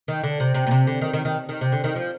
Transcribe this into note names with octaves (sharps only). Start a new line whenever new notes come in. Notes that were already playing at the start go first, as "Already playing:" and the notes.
D#3
D3
C3
C3
A#2
C3
D3
D#3
D#3
D#3
D#3
C3
D3
D#3
F3